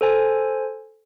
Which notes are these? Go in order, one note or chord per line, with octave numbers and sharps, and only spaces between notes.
A4 C5 G#5